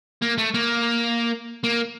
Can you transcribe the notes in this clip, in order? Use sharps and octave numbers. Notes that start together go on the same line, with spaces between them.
A#3
A3
A#3
A#3